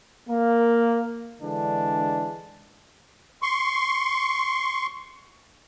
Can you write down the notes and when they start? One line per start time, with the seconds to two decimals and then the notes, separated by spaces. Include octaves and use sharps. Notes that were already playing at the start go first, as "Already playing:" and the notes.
0.29 A#3
1.41 D3 E3 G#3 D4
3.42 C6 C#6